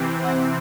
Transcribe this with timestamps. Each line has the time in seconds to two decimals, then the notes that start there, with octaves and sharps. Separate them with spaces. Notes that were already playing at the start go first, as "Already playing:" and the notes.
Already playing: C3 E3 C4
0.22 F#5